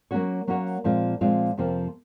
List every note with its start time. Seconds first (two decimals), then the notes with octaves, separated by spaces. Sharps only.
0.11 F#3 A#3 C#4 F#4 C#5
0.47 F#3 A#3 C#4 F#4 C#5
0.84 A#2 F3 G#3 C4 F4
1.21 A#2 F3 G#3 C4 F4
1.57 F2 C3 F3 A#3